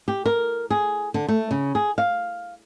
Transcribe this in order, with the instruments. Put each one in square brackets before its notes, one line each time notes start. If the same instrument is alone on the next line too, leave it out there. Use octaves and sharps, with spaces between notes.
[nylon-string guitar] G4
A#4
G#4
D3
A3
C#3
G#4
F5